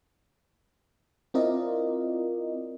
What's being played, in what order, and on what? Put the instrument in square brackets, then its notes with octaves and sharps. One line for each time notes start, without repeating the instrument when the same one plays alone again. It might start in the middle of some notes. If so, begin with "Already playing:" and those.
[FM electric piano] C4 E4 F4 A#4 D5 D#5